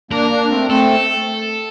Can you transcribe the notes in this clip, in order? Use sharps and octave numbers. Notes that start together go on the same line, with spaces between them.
A#3 D4 A#4
A#3 D4
A3 C4
A3 C4 A4